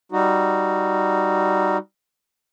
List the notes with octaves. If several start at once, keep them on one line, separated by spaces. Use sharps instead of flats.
G3 D#4 F#4